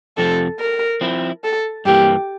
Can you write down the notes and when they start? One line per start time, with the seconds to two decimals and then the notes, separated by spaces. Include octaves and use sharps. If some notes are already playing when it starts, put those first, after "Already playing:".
0.17 F2 C3 F3 C4 A4
0.59 A#4
1.01 F3 C4 E4
1.44 A4
1.85 G2 E3 A#3 G4